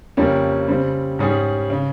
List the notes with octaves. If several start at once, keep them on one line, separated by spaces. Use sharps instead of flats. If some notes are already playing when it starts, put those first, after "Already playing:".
F2 C#3 G3 A#3 C#4
C#3 G3 C4
G#2 G3 C#4 G#4
C#3